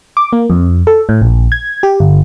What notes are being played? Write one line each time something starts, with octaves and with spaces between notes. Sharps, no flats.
D6
A#3
F2
A4
A2
A#1
G#6
G4
G1